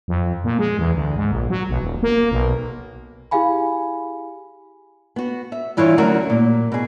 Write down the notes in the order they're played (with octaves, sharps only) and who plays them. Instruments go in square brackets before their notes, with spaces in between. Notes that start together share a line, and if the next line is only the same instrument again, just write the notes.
[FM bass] F2
A#2
G#3
E2
D2
G#2
A#1
F#3
B1
D#1
A#3
B1
[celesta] E4 G4 G#4 F5 G#5 B5
[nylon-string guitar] B3 F#4
E5
G2 E3 E4 F4 C#5
D2 F#3 C#4 F#4 A#4
A#2
B2 G#4